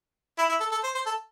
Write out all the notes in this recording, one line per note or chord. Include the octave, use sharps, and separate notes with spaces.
E4
E4
A4
A4
C5
C5
A4